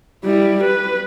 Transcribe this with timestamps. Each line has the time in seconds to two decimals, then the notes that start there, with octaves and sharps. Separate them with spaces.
0.25 G3 E4
0.64 B4